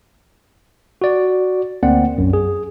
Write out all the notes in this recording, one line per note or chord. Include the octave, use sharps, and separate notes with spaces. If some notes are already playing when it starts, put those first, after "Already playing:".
F#4 D5
D2 A#3 C4 D5 F#5
B1 F#2
G#4